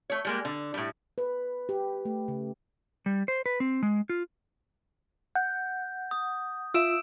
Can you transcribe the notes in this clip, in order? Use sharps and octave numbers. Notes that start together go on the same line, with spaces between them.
A3 C#5
G3 G#3 A#3
D3
A2 G3
B4
G4
A3
C#3
G3
C5
B4
C4
G#3
F4
F#5 G6
D#6
F4 E5 E6 D7 E7